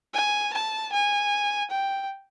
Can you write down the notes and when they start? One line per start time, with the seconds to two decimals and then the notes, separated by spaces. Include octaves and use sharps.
0.14 G#5
0.53 A5
0.92 G#5
1.70 G5